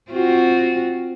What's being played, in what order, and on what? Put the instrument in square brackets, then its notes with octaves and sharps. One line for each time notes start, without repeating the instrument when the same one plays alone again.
[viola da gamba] C4 F4 F#4